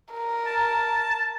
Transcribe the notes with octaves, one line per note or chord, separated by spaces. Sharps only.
A#4
A5